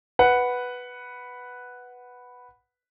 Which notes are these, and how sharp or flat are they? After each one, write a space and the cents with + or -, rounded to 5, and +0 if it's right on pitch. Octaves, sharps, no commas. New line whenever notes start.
B4 +0 F#5 +0